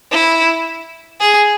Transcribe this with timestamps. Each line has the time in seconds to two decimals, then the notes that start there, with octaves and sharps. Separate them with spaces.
0.12 E4
1.21 G#4